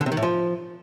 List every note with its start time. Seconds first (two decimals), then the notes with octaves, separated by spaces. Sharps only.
0.01 D3
0.06 C3
0.12 D#3
0.17 A2
0.23 F3